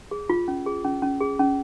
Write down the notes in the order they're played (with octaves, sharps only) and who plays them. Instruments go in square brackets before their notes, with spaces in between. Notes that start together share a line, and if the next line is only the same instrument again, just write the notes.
[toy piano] G#4
F4
C#4
G#4
C#4
C#4
G#4
C#4